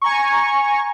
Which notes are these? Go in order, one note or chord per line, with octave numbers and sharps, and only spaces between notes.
G#5 A#5 C#6